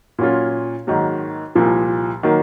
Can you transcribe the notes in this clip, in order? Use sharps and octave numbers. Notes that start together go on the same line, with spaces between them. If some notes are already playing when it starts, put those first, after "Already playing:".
A#2 F#3 C#4 F4
G#2 D#3 F#3 A#3
C2 A#2 F3
D#3 F#3 A#3